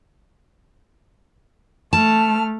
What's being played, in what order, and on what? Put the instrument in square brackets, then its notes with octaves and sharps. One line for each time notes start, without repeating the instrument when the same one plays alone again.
[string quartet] A3 F6 [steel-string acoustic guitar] A5